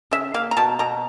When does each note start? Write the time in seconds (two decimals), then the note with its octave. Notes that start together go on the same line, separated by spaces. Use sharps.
0.11 C#3 E5
0.34 A#3 F5
0.51 A#5
0.57 B2 A5
0.79 B2 A#5